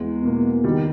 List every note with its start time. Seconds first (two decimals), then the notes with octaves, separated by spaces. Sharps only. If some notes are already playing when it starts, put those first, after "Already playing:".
Already playing: E2 G#3
0.22 B2 A#3
0.64 D#3 G3